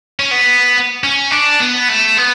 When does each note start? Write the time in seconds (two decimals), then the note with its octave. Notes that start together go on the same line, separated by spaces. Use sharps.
0.20 C#4
0.31 B3
1.04 C#4
1.31 D4
1.60 B3
1.89 A3
2.17 B3